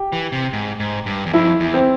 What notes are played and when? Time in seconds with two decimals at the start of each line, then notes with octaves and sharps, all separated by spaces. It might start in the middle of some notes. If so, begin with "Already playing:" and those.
Already playing: G4
0.12 E3
0.32 C3
0.53 G#2
0.80 G#2
1.06 G2
1.26 E2
1.33 F2 E4
1.60 E2
1.74 C4